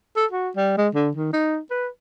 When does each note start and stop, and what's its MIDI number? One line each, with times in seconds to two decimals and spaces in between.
0.16 0.26 69
0.31 0.49 66
0.56 0.77 55
0.78 0.88 56
0.95 1.10 50
1.16 1.30 51
1.33 1.58 63
1.71 1.87 71